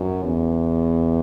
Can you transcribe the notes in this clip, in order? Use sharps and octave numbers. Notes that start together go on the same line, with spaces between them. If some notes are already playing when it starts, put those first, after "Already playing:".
Already playing: F#2
E2